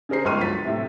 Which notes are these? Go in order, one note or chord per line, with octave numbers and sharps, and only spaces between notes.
C#3 G#4 A#4 C5 C7
G1 C#2 C6 C#6 F6 D#7
F#3 A6 B6
A2 C3